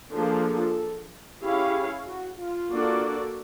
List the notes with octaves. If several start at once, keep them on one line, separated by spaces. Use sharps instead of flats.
F3 A#3 D4 F4 G#4 A4
C#4 E4 G4 G#4 C#5 F5
F#4
F4
A#3 D4 F#4 A4 D5